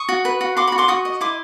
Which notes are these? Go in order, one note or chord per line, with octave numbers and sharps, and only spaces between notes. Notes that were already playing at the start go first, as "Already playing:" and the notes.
Already playing: C#6 D#6
F#4
B4
F#4
F#4 C6 D6
B5 C#6
F#4
C6 D6
F#4 C#6 D#6
D#5
E4 C6 D6